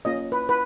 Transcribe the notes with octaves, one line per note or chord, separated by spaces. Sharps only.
A#3 C#4 F4 D#5
B4
B4